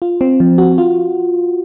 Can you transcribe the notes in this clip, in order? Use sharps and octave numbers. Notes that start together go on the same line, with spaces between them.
F4
C4
F3
F#4
F4